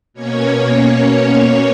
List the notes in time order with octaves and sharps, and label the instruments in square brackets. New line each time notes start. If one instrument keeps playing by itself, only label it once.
[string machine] B2 A#3 C#4 C#5